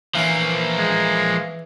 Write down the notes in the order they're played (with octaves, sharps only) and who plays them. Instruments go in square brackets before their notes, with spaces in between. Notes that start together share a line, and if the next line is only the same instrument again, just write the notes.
[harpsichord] E3 C#4 [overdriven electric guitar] F3 A#3
[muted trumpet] G#3